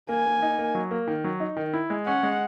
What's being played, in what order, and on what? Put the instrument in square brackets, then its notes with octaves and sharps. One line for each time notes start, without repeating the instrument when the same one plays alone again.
[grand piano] A#3 [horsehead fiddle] G#5
[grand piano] A#3
D#4
A#3
F#3
A#3
D#3
F#3
D#4
D#3
E4
G#3
[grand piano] C#4 [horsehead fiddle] F#5
[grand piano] G#3